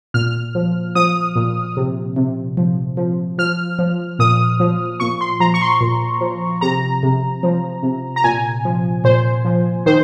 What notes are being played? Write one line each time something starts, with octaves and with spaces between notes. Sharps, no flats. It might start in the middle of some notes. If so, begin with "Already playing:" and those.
A#2 F6
F3
F3 D#6
A#2
C3
C3
F3
F3
F3 F6
F3
A#2 D#6
F3
A#2 C#6
C6
F3 A#5
C#6
C6
A#2
F3
C3 A#5
C3
F3
C3
A#5
A#2 G#5
F3
A#2 C5
F3
D#3 C5